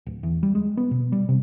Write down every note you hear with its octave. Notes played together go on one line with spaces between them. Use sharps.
D1
E2
G3
G#3
B3
B2
G3
C3